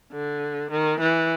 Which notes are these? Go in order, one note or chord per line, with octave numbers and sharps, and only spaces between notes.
D3
D#3
E3